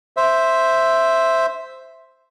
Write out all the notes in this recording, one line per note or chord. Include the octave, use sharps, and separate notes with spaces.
C5 E5